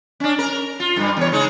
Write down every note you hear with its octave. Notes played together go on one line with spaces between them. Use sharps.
C#4 D4
A#4
F4
G2 G3
E2 C#5
C#3 G#3 D#4